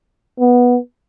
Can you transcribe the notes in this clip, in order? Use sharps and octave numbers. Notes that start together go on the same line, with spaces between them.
B3